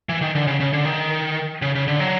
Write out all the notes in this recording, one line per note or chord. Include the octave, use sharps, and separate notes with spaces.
E3
D#3
D3
C#3
C#3
D3
D#3
C#3
C#3
D3
F#3